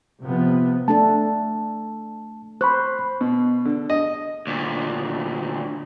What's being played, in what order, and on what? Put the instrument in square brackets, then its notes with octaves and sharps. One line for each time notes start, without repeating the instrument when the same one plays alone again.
[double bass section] C3 F3 B3
[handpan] A3 D4 A4 [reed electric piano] A5
[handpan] C5 [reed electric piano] B5 C#6 F#6
[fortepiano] B2
D3
D#5
[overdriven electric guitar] D2 A#2